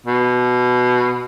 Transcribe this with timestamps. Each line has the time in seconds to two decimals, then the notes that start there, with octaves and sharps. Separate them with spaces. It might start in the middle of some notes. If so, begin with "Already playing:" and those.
0.06 B2